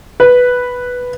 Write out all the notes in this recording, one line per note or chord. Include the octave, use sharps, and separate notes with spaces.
B4